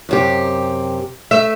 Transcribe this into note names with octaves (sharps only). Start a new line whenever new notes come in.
F#2 C3 G4
A3 E5